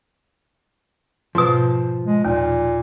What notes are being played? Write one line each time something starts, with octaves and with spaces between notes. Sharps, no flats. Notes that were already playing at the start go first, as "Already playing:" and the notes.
G#2 B2 F3
G#3
D#2 A#2